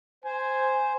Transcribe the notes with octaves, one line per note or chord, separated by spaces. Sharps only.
C5 G#5